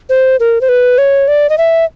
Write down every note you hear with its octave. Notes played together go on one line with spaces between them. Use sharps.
C5
A#4
C5
B4
C#5
D5
D#5
E5